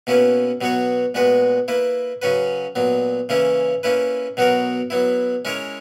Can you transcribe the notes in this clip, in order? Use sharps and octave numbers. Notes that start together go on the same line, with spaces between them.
B2 A#3 C#4 E4 B4
B2 F#3 B3 F#4 C#5
A#2 G#3 B3 F#4 B4
A#3 E4 B4
C#3 F#3 C#4 F#4 B4
A#2 F#3 B3
C#3 E3 A#3 C#4 E4
A#3 C#4 E4 B4
B2 F#3 B3 F#4 A#4
F#3 B3 E4
G#3 C#4 E4 A#4 C#5